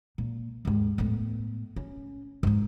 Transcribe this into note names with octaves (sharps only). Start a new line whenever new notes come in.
A#2
D#2 G#2
A2 B3
C#4
G#2 D#4